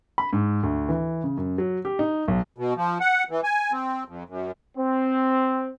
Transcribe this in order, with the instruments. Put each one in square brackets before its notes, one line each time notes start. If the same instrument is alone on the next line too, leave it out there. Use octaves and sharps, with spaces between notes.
[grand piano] B5
G#2
D2
E3
C#3
F#2
F#3
G4
D#4
B1
[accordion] B2
F3
F#5
E3
G#5
C4
F2
F#2
[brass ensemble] C4